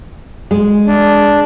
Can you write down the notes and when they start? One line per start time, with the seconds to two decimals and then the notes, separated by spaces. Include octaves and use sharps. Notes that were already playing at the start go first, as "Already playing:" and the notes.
0.51 G#3
0.87 D4